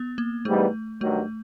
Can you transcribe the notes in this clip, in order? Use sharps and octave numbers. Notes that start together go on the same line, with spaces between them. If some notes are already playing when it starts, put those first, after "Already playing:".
Already playing: B3
A#3
G#2 E3 G3 A3 B3 D#4
G2 D#3 F#3 A3